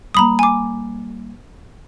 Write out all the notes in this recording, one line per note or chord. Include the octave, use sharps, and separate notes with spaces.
G3 A#3 A#5 B5 D#6
G#5 D6